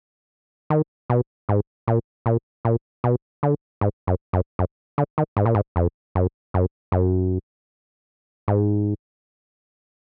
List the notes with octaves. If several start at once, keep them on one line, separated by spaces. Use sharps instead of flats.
D#3
B2
G#2
A#2
A#2
A#2
B2
D3
G#2
F#2
F#2
F#2
D3
D#3
G#2
A#2
G#2
F2
F#2
F#2
F#2
G#2